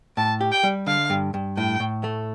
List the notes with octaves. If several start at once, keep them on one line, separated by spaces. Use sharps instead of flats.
A2 A5
G4
G5
G3
D3 F5
G2
G2
A2 G5
A2
A3